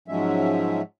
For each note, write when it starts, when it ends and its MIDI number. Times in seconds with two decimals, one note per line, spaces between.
0.08 0.82 44
0.08 0.82 53
0.08 0.82 54
0.08 0.82 56
0.08 0.82 61
0.08 0.82 76